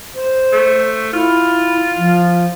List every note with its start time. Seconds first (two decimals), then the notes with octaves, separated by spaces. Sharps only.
0.15 C5
0.52 A3
1.13 E4 F4
1.97 F3